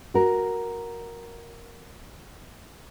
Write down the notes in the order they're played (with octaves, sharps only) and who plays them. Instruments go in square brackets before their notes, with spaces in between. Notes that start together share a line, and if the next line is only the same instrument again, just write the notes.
[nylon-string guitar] F#4 A#4